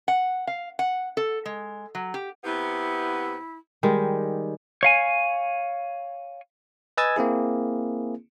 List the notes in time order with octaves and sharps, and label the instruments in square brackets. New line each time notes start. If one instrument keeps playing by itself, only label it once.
[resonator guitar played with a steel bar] F#5
F5
F#5
A4
G#3
F#3
G4
[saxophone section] C3 B3 [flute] E4
[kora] D#3 G3 G#3
[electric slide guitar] C#5 F5 G#5
[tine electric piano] B4 D#5 G#5 E6 G#6 A6
A#3 C4 E4 G#4